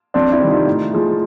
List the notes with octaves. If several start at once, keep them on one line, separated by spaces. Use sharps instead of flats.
F2 C4 D4
D4 E4
C3 D#3 G3
D#4 F4
A2
F3 G#3